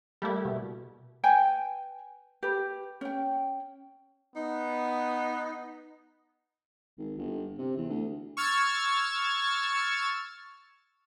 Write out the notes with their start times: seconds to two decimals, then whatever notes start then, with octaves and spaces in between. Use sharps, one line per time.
0.22 G3 A3 A#3 E4
0.45 B2
1.23 B4 G5 G#5
2.43 G4 B4
3.01 C#4 G5
4.36 B3 D#4
6.98 G#1
7.17 G1
7.58 C3
7.77 E2
7.90 D2
8.37 C#6 E6 F6 G#6 A6